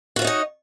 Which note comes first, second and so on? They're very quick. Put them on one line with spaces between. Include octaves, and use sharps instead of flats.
F#4 F4 C#5 D#4 D#5